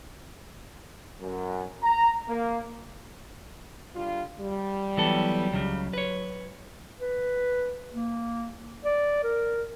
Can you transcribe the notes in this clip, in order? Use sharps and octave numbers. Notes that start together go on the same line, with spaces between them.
F#2
A#5
A#3
D3 G3 F4
G3
E3 F#3 B3 A4
C#2 C#3
B4 C#5
B4
A#3
D5
A#4